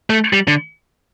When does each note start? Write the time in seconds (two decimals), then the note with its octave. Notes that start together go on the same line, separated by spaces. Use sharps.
0.10 A3
0.33 G3
0.48 D3